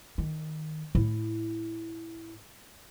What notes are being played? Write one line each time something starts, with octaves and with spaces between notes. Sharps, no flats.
D#3
A2 E4